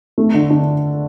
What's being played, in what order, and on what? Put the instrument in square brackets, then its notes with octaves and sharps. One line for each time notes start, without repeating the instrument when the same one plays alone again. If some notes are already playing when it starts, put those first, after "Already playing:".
[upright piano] A3
D3
D4